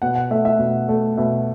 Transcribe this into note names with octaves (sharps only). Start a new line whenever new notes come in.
B2 F#5
F#5
A3 E5
E5
B2
A3
B2 E5